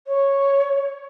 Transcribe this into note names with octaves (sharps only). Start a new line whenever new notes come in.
C#5